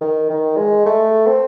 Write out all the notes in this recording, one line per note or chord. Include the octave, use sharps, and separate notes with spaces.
D#3
D#3
G#3
A3
C4